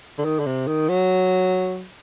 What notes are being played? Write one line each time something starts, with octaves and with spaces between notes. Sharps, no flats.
D3
D#3
D3
C3
D#3
F#3